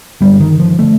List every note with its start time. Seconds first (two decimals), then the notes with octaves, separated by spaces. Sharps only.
0.21 G2 D3 G3
0.41 D#3
0.60 F3
0.79 D3 A3